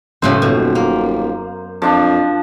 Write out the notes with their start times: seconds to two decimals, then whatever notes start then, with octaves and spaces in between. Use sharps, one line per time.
0.22 E1 F#2 A2 C#3 C5
0.42 D#1 B2
0.75 A#3
1.82 F2 F3 D4